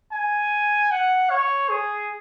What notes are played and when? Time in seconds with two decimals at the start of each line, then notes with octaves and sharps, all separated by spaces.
0.12 G#5
0.91 F#5
1.30 C#5
1.69 G#4